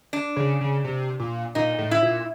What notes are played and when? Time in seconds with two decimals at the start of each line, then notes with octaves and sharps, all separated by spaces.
0.13 D4
0.36 C#3
0.61 C#3
0.84 C3
1.20 A#2
1.55 A#2 D#4
1.78 A2
1.91 E4
2.02 A#2